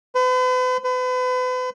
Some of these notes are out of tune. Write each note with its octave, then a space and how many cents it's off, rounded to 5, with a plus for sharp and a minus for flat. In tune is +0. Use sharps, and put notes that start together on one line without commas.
B4 +45
B4 +40